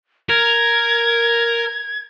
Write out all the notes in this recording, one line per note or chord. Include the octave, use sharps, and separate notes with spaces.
A#4 G#6